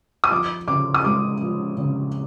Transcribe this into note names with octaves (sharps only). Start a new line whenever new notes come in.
D#6
F3 D6
C#3 D6
D#6
G#3 D6
F3
C#3